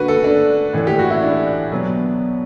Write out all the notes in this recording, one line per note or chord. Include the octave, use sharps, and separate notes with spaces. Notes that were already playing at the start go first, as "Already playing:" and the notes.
Already playing: D3 A3 F#4 B4
A4
D4
A2 E3 A3
G4
F#4
E4
D4
B2 F#3 B3